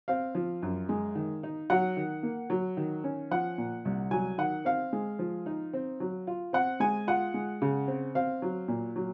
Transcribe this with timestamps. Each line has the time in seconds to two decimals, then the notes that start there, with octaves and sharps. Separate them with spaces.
0.08 C4 F5
0.35 F3
0.62 F#2
0.89 G#3
1.15 D#3
1.43 D#4
1.70 F#3 F#5
1.97 D#3
2.23 A#3
2.50 F#3
2.77 D#3
3.04 C#4
3.31 F3 F#5
3.58 A#2
3.85 C2
4.11 F#3 G#5
4.38 D#3 F#5
4.65 C4 F5
4.93 G#3
5.19 F3
5.46 D#4
5.73 C4
6.00 F#3
6.27 F4
6.53 C4 F#5
6.80 G#3 G#5
7.07 F4 F#5
7.34 G#3
7.62 C#3
7.88 C4
8.15 C4 F5
8.42 F#3
8.68 A#2
8.96 F#3